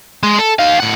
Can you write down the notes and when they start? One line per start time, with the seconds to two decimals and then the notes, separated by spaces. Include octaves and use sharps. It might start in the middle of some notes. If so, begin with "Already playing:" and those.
0.23 G#3
0.39 A4
0.59 D#4 F5
0.80 A2 F#5